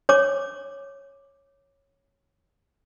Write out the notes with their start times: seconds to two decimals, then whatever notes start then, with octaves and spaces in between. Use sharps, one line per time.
0.09 C#5 D6